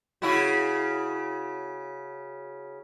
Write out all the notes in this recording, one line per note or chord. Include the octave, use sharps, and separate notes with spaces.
C#3 E4 F#4